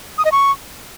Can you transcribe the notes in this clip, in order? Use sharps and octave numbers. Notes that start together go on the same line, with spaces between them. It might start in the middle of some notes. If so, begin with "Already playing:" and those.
D#6
D#5
C#6